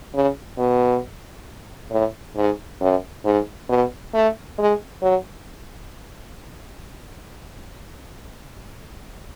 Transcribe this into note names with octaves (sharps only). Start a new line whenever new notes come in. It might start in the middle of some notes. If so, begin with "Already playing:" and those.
C#3
B2
A2
G#2
F#2
G#2
B2
A3
G#3
F#3